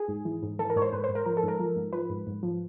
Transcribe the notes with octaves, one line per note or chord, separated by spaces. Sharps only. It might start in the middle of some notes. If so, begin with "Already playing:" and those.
Already playing: G#4
G#2
E3
G#2
E3 A4
A#4
G#2 C#5
C5
G#2 B4
C5
G#2
A#4
F3 A#4
A4
G#2 A#4
F3
G#2
F3 B4
G#2
G#2
F3